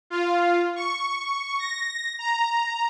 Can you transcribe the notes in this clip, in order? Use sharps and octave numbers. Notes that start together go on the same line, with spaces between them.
F4
C#6
A#6
A#5